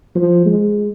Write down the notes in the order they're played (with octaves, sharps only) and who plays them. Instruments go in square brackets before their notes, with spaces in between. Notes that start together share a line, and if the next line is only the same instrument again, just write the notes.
[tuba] F3
G#3